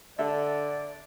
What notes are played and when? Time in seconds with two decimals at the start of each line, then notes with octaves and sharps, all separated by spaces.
0.19 D3 A4 D5 E5